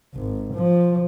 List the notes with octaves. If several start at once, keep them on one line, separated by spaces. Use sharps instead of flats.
G#1
F3